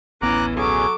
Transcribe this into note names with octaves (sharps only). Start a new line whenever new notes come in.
D1 A1 E3 B3 C#4 A#5 D6 F#6
B2 F#3 C#4 G#4 A4 D6